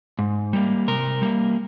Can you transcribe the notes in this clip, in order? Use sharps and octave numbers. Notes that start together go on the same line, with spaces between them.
G#2
G3 A#3
C3 A#4
G3 A#3